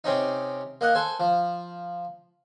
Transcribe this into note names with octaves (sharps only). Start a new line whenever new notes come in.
C3 C4 C#4 D#4
A#3 D#5 F#5
A4 C5 G#5
F3